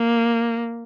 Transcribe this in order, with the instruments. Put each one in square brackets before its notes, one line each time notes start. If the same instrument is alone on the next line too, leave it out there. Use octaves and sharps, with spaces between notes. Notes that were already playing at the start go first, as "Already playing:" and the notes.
Already playing: [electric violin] A#3